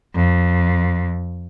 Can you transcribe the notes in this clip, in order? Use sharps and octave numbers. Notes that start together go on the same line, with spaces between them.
F2